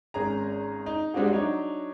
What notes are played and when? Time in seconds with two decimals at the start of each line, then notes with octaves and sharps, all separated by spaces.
0.14 G#1 C#4 G#4 A#5
0.86 D#4
1.13 G3 G#3 C4 D4 F#4 G#4
1.33 F#3 D4 D#4 C#5